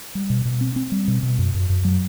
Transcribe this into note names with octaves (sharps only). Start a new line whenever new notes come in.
G3
B2
B2
C4
C4
G3
B2
B2
F#2
F#2
F#2
F#3